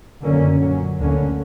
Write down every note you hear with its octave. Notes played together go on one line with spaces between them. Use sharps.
F#2 D3 A#3 C#4
A#2 F#3 C#4
D2 D3 A#3 C#4